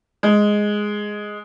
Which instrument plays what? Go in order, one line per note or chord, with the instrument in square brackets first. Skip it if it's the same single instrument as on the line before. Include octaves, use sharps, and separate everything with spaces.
[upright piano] G#3